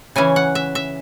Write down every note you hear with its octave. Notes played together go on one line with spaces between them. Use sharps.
C#3 E3 C#4 G#5
F#5
E5
E5